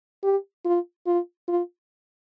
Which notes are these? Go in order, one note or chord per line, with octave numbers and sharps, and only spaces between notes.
G4
F4
F4
F4